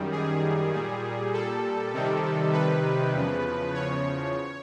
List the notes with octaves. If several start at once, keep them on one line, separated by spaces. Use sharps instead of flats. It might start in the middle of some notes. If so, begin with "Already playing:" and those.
Already playing: F#2 D#3 G3
G#4
A#2 G3
A4
C3 D#3 G3
B4
E2 C#3 F3
C#5